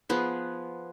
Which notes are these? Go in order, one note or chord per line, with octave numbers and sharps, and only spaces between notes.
F3 B3 G#4